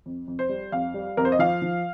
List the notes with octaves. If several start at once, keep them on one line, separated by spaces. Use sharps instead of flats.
F2
F2
C5
G3
F2 F5
G3
F2 A#4
C5
D#5
F3 F5
F3